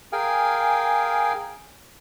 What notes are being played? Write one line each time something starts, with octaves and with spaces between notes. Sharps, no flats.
G#4 A#4 F5 G5 G#5